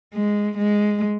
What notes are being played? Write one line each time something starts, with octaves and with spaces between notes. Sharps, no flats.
G#3
G#3